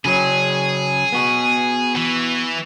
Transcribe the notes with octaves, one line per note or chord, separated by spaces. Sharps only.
C#3 F#3 C#4 G#4
B3 F#4
E3